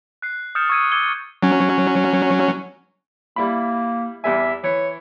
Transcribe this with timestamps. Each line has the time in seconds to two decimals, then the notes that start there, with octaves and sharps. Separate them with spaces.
0.22 F#6 C7
0.55 D#6 F6 G6 A6 C#7 E7
0.69 C#6 D#6 E6 G#6 C#7 D#7
0.92 D6 E6 G#6 C#7 G7
1.42 F#3 C#4
3.36 G3 A#3 E4 B5
4.24 E2 G3 E5 G#5
4.64 E3 C#5